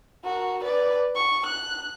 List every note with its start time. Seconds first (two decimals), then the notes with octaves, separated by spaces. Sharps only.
0.24 F#4 A#4
0.63 B4 D5
1.16 C#6
1.46 F#6